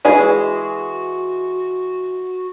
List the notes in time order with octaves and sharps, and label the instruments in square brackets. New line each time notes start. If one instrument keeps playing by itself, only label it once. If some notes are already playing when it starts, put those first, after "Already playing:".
[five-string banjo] E3 G#3 G#4 [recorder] F#4